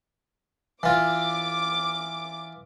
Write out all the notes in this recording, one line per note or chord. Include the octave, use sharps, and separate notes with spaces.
E3 F4 D6